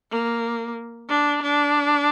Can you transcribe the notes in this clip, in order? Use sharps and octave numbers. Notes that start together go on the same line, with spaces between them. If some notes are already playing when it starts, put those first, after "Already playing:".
A#3
D4
D4